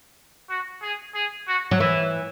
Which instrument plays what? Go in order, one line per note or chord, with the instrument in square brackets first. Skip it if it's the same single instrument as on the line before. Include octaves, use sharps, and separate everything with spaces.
[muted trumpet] F#4
G#4
G#4
F#4
[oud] F#3
[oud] E3 [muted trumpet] E4